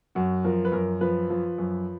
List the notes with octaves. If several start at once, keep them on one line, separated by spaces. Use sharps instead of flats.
F#2 F#4
F3 A#4
B4
F#2 A#4
F3 B4
F3
F#2